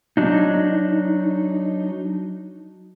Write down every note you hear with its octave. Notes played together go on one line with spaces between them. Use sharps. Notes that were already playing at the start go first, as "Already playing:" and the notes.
F#3 D4 D#4